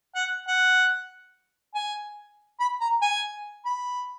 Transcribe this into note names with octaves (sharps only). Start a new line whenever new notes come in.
F#5
F#5
G#5
B5
A#5
G#5
B5